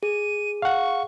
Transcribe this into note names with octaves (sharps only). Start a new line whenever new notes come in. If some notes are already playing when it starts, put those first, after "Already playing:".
G#4 D#7
F5 F#5 C#6